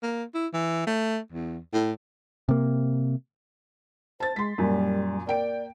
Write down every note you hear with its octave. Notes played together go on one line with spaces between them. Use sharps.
A#3
E4
E3
A3
E2
A2
C3 A#3
C5 A5 A6
G#3 C6 B6
F#2 A#2 G3
A#3 D5 G5 D7